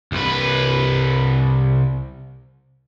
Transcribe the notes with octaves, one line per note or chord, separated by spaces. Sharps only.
C2 B4